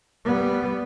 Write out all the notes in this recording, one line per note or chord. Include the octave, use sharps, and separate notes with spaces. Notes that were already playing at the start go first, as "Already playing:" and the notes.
G3 B3